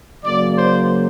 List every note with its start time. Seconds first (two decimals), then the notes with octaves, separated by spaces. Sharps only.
0.24 C#3 F#3 A#3 D5
0.58 C5